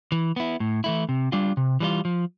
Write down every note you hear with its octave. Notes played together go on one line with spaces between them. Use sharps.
E3
B3 E4
A2
E3 A3 E4
C3
G3 D4 F4
C3
E3 G3 D4 F4
F3